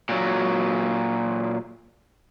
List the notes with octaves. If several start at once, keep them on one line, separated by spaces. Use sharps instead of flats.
A#2 F#3